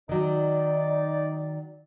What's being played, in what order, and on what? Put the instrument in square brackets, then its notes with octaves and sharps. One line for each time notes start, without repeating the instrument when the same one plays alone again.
[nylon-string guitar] D#3 F#3 [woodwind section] D#4 D5